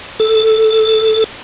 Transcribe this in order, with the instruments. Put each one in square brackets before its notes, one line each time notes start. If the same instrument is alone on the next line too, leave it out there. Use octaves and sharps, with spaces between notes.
[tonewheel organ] A4